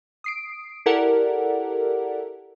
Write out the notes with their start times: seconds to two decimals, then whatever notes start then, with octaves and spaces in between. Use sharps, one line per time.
0.24 D#6 C7 D7
0.86 E4 G4 A4 A#4 D5 F#5